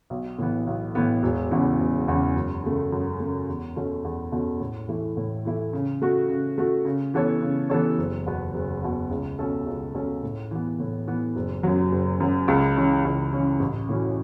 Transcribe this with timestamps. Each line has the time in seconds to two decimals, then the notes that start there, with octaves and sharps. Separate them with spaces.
0.10 B1
0.39 A2 E3 B3
0.67 B1
0.95 A2 E3 B3
1.23 E1
1.51 E2 C#3 E3
1.79 E1
2.08 E2 C#3 E3
2.36 F#2
2.64 C#3 A3
2.92 F#2
3.20 C#3 A3
3.48 E2
3.76 B2 A3 C#4
4.04 E2
4.32 B2 A3 C#4
4.60 A2
4.88 E3 A3 E4
5.17 A2
5.45 E3 A3 E4
5.73 C#3
6.02 A3 F#4
6.29 C#3
6.58 A3 F#4
6.85 C#3
7.14 E3 B3 A4 C#5
7.42 C#3
7.70 E3 B3 A4 C#5
7.98 F#1
8.26 E2 B2 B3
8.54 F#1
8.82 E2 B2 B3
9.10 C#2
9.39 B2 A3 C#4 A4
9.67 C#2
9.95 B2 A3 C#4 A4
10.23 A2
10.51 E3 B3
10.80 A2
11.07 E3 B3
11.36 F#1
11.63 F#2 F#3
11.92 F#1
12.20 F#2 F#3
12.48 C#2
12.77 C#3 E3 C#4
13.05 C#2
13.33 C#3 E3 C#4
13.60 A1
13.89 A2 E3 C#4 F#4